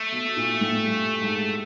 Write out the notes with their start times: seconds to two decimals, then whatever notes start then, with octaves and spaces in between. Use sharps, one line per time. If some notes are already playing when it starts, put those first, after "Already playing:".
Already playing: A3
0.12 B2
0.37 A#2
0.61 A2
0.85 G2
1.22 G#2